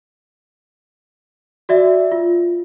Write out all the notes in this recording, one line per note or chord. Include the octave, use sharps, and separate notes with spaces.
F#4 D5 E5
F4